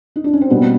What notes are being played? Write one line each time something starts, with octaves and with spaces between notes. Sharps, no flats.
D#4
D4
C#4
C4
B2 G3 A#3 B3